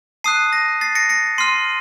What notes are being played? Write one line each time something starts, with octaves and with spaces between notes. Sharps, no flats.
A5 D#6 F#6 C7 D#7
A#6
A6 C7
A#6 C#7
A#6 C#7
C6 F6 C7 D#7